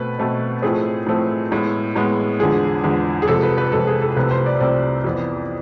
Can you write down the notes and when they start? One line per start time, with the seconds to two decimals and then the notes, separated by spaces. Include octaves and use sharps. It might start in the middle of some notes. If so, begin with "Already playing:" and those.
Already playing: B2 A3 C4 B4
0.19 B2 A3 C4
0.62 A2 F3 A3 C4 G#4
1.06 A2 F3 A3 C4
1.51 A2 G#3 B3
1.96 A2 G#3 B3
2.39 E2 D3 F3 G#3 G#4
2.83 E2 D3 F3 G#3
3.22 G#4
3.28 F2 C3 F3 G#3 A4
3.43 B4
3.58 B4
3.72 F2 C3 F3 G#3 A4
3.87 G#4
4.02 A4
4.16 C2 C3 F3 A3 C4 B4
4.31 C5
4.46 D5
4.60 C2 C3 F3 A3 C4 D5
5.04 F2 E3 B3